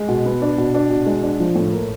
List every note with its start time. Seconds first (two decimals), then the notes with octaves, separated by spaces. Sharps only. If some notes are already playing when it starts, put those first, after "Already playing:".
Already playing: G#3
0.08 B2
0.26 B3
0.42 D4
0.58 B2
0.74 D4
0.90 B2
1.06 G#3
1.23 D4
1.40 F3
1.55 A2
1.72 A#3